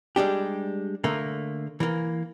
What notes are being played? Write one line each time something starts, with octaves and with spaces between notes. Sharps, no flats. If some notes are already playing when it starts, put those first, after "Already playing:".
G3 G#3 D4 G4
D3 A3 A#3
E3 A#3